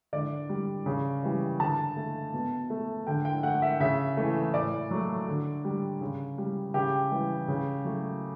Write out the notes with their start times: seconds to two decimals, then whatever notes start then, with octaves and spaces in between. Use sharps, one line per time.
0.13 D3 D5
0.49 G3
0.86 C#3
1.23 E3 G3
1.60 D3 A5
1.97 A3
2.34 B2
2.70 A3
3.07 D3 G5
3.25 G5
3.43 A3 F#5
3.62 E5
3.80 C#3 E5
4.17 E3 A3
4.54 A2 D5
4.91 F#3 A3
5.28 D3
5.65 G3
6.01 C#3
6.38 G3
6.74 C#3 G4
7.11 E3 G3
7.48 C#3
7.85 F#3 A3